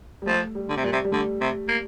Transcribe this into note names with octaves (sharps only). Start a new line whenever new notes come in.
G3
F3 A3
G3
D3
C3
A#2 G3
C3
G3
D3 A3
C3
A#3